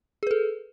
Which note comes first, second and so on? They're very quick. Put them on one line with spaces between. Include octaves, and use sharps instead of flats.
G#4 B4 A4